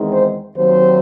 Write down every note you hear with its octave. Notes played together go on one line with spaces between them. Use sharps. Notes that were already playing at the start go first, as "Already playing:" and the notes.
Already playing: E2 D#3 G#3 C4 D#4
C5
D#2 D#3 F#3 C4 C5